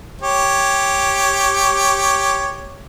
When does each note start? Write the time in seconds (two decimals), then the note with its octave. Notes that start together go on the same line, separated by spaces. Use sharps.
0.21 G4 C#5